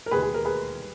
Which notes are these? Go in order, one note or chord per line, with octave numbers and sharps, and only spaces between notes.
A#4
E1 D#2 D#3 G#4 B4
G#4
A#4
G#4 B4
G3